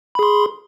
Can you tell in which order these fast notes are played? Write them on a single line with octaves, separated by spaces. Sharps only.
B5 G#4 C6